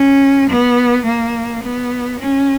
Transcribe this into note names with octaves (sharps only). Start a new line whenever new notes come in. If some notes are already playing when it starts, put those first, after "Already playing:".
Already playing: C#4
B3
A#3
B3
C#4